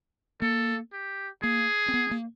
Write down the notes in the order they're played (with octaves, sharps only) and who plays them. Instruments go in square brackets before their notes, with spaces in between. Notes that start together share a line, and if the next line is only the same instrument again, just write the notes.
[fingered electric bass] A#3 [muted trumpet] A4
[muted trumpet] G4
[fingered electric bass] A#3 [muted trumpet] G#4
[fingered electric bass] C4
B3
A#3